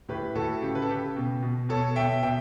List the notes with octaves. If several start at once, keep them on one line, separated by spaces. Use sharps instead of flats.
A2 G4 B4
A2 F#4 A4
C#3 G4
B4
A4
C#3 G4
B2
B2
B2 A4 C#5
B2 E5 G5
B2 E5 G5